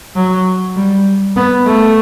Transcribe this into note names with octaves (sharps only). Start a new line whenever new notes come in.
F#3
G3
B3
A3